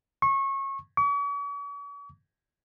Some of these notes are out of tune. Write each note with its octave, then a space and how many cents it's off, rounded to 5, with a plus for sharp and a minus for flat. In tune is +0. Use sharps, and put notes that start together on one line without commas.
C#6 -25
C#6 +45